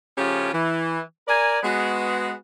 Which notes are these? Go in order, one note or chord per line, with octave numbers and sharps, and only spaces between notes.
C#3 F3 A3 C#4 F4 G4
E3
A#4 D5 G#5
G#3 B3 F#4